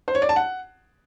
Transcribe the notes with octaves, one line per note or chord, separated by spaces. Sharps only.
C5
C#5
D5
A5
F#5